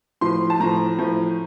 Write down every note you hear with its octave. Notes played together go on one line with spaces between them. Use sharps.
A2 F3 C6
A5
A2 F3 A#5
A2 F3